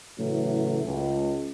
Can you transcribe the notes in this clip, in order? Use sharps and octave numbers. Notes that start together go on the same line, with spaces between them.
A2 C#3 E3 F#3 A3
C#2